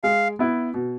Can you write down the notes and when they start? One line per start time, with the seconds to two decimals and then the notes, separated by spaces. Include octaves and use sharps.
0.03 G#3 F5
0.39 B3 E4
0.74 B2